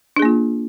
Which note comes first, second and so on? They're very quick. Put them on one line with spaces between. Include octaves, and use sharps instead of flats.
D4 G#4 A#3 F4